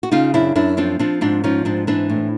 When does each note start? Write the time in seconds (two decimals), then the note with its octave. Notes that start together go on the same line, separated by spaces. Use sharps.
0.03 F#4
0.11 C#3 D#4 F4
0.34 F#2 D4 E4
0.56 F#2 D4 E4
0.77 F3 C4 D4
0.99 F3 C4 D4
1.21 G#2 C4 D4
1.44 F3 C#4 D#4
1.65 G#2 C4 D4
1.87 E3 C4 D4
2.10 A2